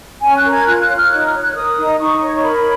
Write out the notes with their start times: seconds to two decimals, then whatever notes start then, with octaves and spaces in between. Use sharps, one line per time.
0.22 C#4 G#5
0.37 F#6
0.44 A#4
0.52 G#6
0.66 F4 F#6
0.81 F#6
0.89 C#5
0.96 F6
1.11 D#4 F#6
1.21 F#6
1.26 F6
1.33 C#5
1.40 F#6
1.55 A#4 D#6
1.77 D#4
1.99 D#4 C#6
2.22 C#5
2.43 A#4 B5